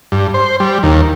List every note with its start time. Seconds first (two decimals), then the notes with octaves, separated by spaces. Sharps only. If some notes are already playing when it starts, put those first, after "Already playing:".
0.12 G2
0.34 C5
0.60 G3
0.83 D#2